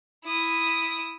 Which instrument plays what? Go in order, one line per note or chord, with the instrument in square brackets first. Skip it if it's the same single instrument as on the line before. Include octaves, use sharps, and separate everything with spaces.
[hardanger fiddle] E4 D#6